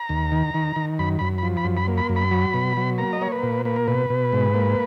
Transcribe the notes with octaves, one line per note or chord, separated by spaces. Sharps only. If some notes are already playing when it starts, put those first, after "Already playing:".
Already playing: A#5
D#2
D#3
D#3
D#3
F#2 B5
F#2 B5
F3 B5
B5
F#2
B5
A#3
B5
F#2
B5
F#3
B2
F#3
A#3 A#5
D#5
A#3 C#5
B4
A#2
A#3 B4
A#4
B2 B4
B2
G#2
A#3